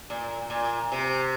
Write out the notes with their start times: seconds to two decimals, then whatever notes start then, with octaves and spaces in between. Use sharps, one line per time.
0.10 A#2
0.50 A#2
0.92 C3